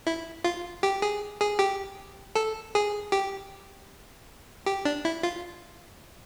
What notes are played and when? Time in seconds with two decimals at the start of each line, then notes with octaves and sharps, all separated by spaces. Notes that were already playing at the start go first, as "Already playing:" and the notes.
0.07 E4
0.44 F4
0.83 G4
1.02 G#4
1.41 G#4
1.59 G4
2.35 A4
2.75 G#4
3.12 G4
4.66 G4
4.85 D4
5.05 E4
5.23 F4